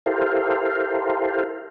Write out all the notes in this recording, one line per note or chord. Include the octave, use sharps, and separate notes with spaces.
E4 G4 A4 A#4 C5 F5